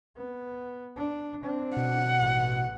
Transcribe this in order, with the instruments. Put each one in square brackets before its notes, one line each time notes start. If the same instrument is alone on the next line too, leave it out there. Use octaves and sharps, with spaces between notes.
[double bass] B3
D4
C4 D4
[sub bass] B2 [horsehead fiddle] F#5
[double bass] A1